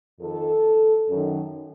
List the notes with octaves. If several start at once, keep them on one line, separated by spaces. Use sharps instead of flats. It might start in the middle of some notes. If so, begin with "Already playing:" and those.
F2 D#3 A4
F#2 D#3